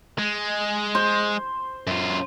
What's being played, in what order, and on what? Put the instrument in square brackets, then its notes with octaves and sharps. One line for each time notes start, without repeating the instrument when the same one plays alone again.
[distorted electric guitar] G#3
[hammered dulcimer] C5
[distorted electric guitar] F#2 F4